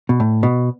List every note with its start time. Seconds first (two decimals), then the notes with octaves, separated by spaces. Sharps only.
0.09 B2
0.20 A2
0.43 B2